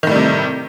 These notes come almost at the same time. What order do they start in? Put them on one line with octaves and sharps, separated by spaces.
D#3 A2 G3 C3